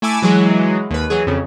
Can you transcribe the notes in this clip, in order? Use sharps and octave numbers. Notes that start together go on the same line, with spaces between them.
A3 E4 G#5 D6 E6
E3 F#3 G#3 G#4
D#2 B4
E3 F#3 G#4
F2 C#3